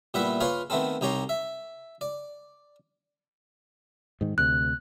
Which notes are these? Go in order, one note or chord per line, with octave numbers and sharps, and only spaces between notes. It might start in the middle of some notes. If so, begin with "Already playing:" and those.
A#2 G3 B3 E4 B4 E5
F4 G#4 B4 C#5 F5 C6
D#3 A3 B3 C4 A4
C2 D#4 G4 C#5 A#5 C6
E5
D5
G#2 D#3
D2 C3 F#6